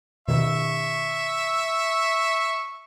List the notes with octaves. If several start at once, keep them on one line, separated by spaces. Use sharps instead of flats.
B2 D#3 E5 C#6